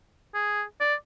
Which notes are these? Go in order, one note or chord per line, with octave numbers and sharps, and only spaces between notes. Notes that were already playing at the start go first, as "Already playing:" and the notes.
G#4
D5